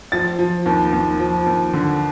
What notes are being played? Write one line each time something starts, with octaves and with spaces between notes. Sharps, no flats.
F3 A6
F3
D#2
D#2
F3
D#2
D3